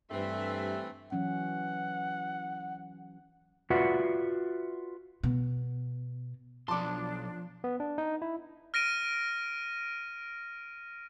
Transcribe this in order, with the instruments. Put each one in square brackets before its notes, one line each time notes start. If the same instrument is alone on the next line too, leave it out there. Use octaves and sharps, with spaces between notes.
[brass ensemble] G2 [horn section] E3 A3 C4 [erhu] E5
[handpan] E3 F#3 C#4 [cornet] F#5
[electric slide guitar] F4 F#4 B4 D5 E5 F#5
[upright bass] B2
[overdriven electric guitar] B1 C6 [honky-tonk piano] F3 [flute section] D4 [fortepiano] A5 D6
[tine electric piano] B3
D4
D#4
E4
[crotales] F6 A#6 D7 D#7